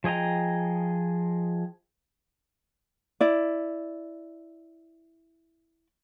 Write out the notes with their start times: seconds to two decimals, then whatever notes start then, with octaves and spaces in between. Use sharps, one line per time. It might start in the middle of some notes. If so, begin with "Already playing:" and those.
0.04 F3 G#4 D#5 G5 A#5
3.20 E4 D5